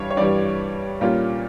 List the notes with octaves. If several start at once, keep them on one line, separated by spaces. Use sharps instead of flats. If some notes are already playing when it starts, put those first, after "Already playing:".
Already playing: G2 E3 G3 C#5 F5
C#5
G2 E3 G3 D5
A#2 G3 A#3 C#4 F4